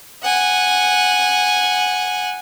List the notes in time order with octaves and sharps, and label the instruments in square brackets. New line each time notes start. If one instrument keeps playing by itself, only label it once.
[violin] F#5 G#5